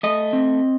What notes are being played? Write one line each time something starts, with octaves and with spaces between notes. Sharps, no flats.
A3 D#5
C4